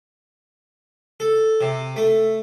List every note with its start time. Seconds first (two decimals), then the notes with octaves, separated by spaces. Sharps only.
1.20 A4
1.61 C3
1.96 A3